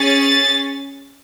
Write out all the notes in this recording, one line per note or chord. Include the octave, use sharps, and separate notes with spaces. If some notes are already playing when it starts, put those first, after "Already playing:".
Already playing: C#4 G#4 A6